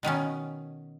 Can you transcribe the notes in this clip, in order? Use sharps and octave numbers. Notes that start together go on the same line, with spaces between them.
B2 D#3 B3 C#4